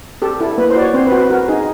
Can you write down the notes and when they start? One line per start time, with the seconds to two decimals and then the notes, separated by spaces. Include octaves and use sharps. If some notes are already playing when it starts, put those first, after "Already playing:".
0.22 G4 A4
0.40 E4 A4
0.58 A#3 B4
0.70 C5
0.75 F#4 D5
0.82 C#5
0.94 C4 C5
1.07 B4
1.12 F#4 C5
1.18 B4
1.30 F#4 A#4
1.48 D#4 G#4